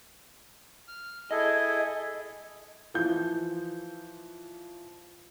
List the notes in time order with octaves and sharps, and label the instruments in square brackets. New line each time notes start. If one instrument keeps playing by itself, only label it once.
[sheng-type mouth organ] F6
[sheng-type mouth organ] E4 G#4 A4 [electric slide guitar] D#5
[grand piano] E3 F3 G6